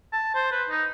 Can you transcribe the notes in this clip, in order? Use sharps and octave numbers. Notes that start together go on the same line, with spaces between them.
A5
C5
B4
D#4